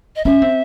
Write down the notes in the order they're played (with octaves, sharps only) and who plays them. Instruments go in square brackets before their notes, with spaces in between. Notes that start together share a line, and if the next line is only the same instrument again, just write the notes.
[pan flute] D#5
[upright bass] C#4 [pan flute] E5
[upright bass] C4